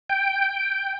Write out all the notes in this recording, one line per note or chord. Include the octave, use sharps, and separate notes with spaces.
G5